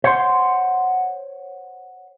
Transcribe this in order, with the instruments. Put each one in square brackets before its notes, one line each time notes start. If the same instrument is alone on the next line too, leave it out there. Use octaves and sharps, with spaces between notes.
[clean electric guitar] C5 C#5 F#5 B5 C6